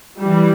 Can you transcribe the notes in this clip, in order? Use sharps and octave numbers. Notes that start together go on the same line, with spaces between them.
E3 G3